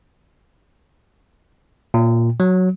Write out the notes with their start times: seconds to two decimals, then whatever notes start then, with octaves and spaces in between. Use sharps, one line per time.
1.94 A#2
2.40 F#3